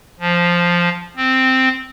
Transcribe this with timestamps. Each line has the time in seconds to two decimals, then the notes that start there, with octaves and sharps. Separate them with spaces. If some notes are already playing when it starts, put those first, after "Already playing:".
0.20 F3
1.17 C4